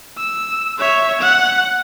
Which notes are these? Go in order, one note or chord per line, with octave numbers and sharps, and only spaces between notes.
E6
C#5 E5
F#5